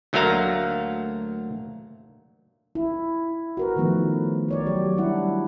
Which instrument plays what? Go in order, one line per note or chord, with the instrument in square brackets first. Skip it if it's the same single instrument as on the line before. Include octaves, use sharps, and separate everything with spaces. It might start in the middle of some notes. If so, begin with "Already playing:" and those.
[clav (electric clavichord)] D2 F#3 A3 A#3 F5 A#5
[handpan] E4
F#4 A#4 B4
D#3 F3 A3 B3 D#4
A#4 C#5 D5
F#3 G4
G3 D4 E4 F#5